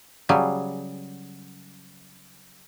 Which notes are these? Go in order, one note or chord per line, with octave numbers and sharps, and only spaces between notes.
C#3 F#3 G3 G#4